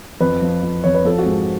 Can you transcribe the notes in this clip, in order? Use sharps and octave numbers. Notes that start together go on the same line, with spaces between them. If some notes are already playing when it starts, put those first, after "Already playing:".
F2 B4
F3
F3
F2 C#5
B4
F3 A4
F#4
G#2 G#4